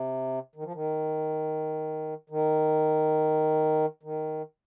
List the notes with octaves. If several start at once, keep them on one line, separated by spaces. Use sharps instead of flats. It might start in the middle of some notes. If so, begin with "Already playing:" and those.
Already playing: C3
D#3
F3
D#3
D#3
D#3